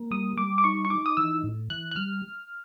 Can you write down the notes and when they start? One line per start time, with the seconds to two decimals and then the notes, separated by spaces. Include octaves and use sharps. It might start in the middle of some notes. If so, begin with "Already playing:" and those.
Already playing: A#3
0.11 G3 D#6
0.37 G3 D6
0.58 D6
0.64 D#4 C#6
0.85 C#6
0.90 D#4 D6
1.06 D#6
1.17 E3 E6
1.44 A2
1.70 E3 F#6
1.91 F#6
1.96 G3 F6